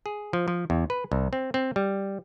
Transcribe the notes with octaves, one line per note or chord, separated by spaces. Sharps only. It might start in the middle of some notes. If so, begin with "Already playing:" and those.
G#4
F3
F3
E2
B4
C2
C4
C4
G3